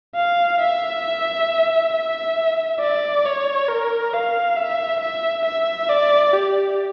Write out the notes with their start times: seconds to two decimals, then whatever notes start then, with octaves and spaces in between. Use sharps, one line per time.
0.15 F5
0.60 E5
1.93 E5
2.80 D5
3.25 C#5
3.68 A#4
4.13 F5
4.56 E5
5.00 E5
5.45 E5
5.89 D5
6.33 G4